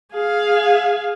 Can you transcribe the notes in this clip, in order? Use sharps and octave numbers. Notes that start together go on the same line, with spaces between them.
G#4 F5